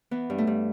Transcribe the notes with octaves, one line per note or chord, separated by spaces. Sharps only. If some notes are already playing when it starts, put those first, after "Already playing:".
E3 B3
G2
A3
G2